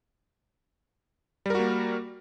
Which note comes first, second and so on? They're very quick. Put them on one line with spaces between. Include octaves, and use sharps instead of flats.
G3 A#4 F#4 A#3